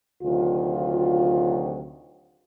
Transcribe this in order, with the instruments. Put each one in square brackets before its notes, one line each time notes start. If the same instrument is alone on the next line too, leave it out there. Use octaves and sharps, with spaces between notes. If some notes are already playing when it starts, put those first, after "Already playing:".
[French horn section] D2 C3 D#3 F#3 F4